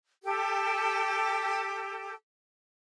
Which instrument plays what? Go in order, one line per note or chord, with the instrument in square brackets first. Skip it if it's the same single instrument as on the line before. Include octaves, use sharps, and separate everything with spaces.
[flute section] G4 A4